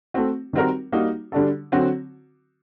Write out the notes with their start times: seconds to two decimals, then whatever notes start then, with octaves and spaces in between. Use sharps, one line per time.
0.14 A3 C4 F#4
0.53 D#3 G3 C4 F#4 A#4
0.92 G3 A#3 D#4 F#4
1.32 D3 G3 D4 F#4 A4
1.72 D3 F#3 C4 F#4